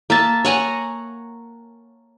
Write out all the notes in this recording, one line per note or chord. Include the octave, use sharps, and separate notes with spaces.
A#3 E5 A5
C#5 F#5 G#5 A#5